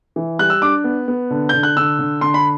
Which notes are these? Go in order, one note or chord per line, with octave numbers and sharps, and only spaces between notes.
E3
G3 F#6
E6
D4 D6
B3
B3
D3
D3 G6
F#6
D3 E6
D3
D3 C6
B5